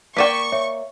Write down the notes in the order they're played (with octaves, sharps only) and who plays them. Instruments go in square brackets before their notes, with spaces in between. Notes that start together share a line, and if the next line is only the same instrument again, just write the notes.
[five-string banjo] A#3 D5 G5 [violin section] C#6 [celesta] B6 D#7 E7
[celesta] C#5 E5